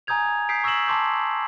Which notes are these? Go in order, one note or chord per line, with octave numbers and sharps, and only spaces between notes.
G#5 A#5 D#6 G6 G#6 F7
D#6 G6 B6 C7 D7
C#6 E6 A#6 B6 E7 F#7
A5 C6 D6 G6